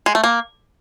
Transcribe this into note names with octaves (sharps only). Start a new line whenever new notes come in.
G#3
A3
A#3